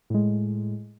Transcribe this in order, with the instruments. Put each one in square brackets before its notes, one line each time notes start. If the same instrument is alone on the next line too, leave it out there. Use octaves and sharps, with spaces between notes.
[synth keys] A2 G#3